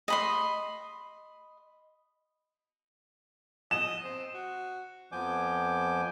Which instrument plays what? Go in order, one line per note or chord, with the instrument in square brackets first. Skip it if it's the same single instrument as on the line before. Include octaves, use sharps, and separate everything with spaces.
[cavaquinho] D#5 B5 C6
[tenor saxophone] D#5 [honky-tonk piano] E7
[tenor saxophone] C4
F#4
[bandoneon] F2 F3 B3 G#5 D6 G6